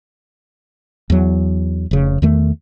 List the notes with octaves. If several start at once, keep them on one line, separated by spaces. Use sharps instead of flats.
E2 F#3
F1 C#3
E2 D#3 A3